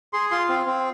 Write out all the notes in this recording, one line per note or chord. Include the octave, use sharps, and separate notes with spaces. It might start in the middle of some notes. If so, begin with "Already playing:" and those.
G#4 C6
F4 C6
C4
C4